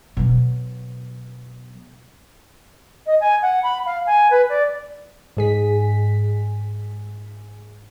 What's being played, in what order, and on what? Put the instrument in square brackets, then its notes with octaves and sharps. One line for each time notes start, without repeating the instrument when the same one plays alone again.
[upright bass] B2 F#3
[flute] D#5
G#5
F#5
B5
F5
G#5
B4
D5
[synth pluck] G#2 G#4 B6